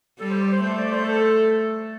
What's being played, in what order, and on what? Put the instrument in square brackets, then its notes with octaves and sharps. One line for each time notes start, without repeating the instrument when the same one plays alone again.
[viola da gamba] G3 [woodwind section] A4
[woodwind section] C5
D5
C5
[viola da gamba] A3 [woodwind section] C5
[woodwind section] D5
C5
A4